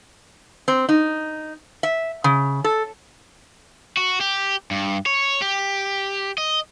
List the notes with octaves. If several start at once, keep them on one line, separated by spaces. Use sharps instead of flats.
C4
D#4
E5
C#3
A4
F#4
G4
G2
C#5
G4
D#5